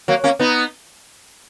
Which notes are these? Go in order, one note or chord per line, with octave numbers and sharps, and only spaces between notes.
F#3 A#3
A#3 C#4
B3 D#4